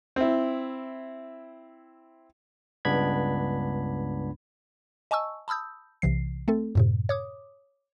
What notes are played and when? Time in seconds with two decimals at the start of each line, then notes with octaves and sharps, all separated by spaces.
0.16 C4 E4
2.85 C#2 G2 B3 D4 B5 G#6
5.11 D#5 G#5 A5 C#6 E6
5.48 A5 B5 D#6 E6 G6
6.02 B1 C3 E3 C7
6.48 A3 C4 A4
6.75 F#2 A2 C3
7.09 C#5 D6 D#6